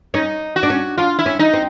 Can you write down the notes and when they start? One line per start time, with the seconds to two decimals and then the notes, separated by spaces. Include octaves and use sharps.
0.14 C#4 D#4
0.56 F#4
0.63 D4
0.70 C#4
0.98 D4 F4
1.19 E4
1.26 C#4
1.39 D#4
1.53 C4